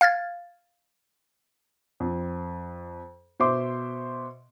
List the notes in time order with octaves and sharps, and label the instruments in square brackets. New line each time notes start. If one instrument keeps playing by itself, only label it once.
[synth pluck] F5 F6 G#6 A6
[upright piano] F2
B2 C5 E5 C6 D6